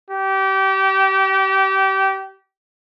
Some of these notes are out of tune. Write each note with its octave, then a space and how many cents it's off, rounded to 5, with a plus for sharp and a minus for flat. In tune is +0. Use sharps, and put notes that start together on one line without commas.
G4 -25